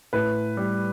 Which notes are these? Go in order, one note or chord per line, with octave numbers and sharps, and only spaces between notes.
A2 B4
G3